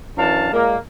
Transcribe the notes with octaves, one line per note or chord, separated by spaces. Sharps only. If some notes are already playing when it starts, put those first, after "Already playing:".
F#2 E3 D4 F5 A5
A#2 G#3 A#3